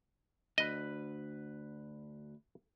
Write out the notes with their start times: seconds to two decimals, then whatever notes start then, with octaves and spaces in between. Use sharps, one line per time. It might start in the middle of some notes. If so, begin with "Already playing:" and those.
0.58 D2 B4 D#5